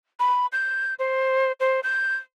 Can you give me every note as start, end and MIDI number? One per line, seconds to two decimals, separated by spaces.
0.19 0.46 83
0.52 0.94 91
0.99 1.52 72
1.60 1.80 72
1.83 2.15 91